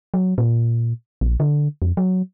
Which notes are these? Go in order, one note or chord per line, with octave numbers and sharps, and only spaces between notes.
F#3
A#2
A#1
D3
F2
F#3